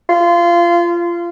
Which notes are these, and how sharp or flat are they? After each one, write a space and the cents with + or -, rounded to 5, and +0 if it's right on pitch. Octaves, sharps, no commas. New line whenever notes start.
F4 -20